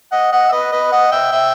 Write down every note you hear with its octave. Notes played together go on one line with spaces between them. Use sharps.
D#5 F#5
D#5 F#5
E5
B4 D#5
B4 D#5
D#5 F#5
E5 G5
E5 G5